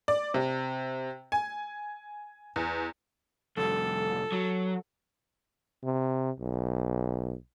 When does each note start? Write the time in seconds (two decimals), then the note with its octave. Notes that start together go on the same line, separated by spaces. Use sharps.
0.08 D5
0.34 C3
1.32 G#5
2.56 E2
3.57 C2 F2 A4
4.32 F#3
5.84 C3
6.40 B1